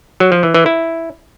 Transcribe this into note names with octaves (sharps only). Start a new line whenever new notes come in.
F#3
F3
E3
E3
E4